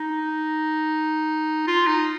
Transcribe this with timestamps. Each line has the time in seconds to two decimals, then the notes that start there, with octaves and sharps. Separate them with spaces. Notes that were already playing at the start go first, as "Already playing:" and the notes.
Already playing: D#4
1.67 F4
1.87 D#4